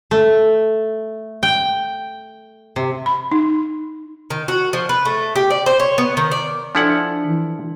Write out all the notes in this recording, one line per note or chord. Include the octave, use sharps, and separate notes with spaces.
A3
G5
C3
B5
D#4
D#3
F#4
F3
B4
A3
G4
D5
C5
C#5
B3
D#3
D5
F3 D4 E4 A4 D5 F#5
E3